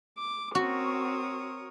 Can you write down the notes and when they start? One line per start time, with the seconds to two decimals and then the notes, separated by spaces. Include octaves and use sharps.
0.18 D6
0.55 C4 F#4 A#4 C#5 D#6